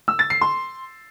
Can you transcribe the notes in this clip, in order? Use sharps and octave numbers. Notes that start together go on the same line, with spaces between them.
E6
A6
C7
C6